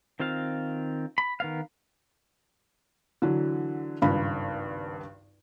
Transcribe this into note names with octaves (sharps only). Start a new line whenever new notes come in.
D#3 C4 F4 F5
B5
D#3 B3 F5
D3 E3 F#3
G#1 C#2 G2 B5